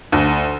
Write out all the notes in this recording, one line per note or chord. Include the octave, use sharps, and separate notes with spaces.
D2